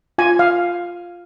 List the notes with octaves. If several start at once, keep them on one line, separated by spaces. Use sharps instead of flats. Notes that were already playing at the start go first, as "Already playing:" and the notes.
F4 G#5
F5